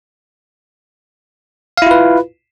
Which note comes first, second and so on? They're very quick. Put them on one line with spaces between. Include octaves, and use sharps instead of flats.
F5 E4 F4 B4